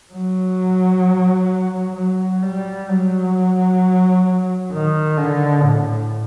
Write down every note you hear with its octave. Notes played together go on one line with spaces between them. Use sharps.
F#3
F#3
G3
F#3
D#3
D3
A2